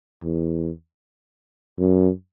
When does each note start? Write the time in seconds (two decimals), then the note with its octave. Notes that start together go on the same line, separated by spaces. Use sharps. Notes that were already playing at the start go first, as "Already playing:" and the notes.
0.23 E2
1.78 F#2